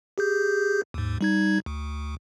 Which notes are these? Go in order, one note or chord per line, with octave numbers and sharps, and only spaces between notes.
G4 G#4 G6
D#2 G#2
G3 D#4 G#6
D2